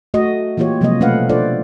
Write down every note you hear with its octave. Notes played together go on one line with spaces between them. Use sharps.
A3 F#4 D#5
E3 A#3 F4 G4 C#5
C3 F3 F#3 G#3 A#3 D#5
B2 A3 C#4 B4 F5 F#5
D4 F4 A4 C5 D5